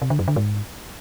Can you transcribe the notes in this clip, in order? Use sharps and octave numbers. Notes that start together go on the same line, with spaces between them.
C3
D3
F#2
D3
G#2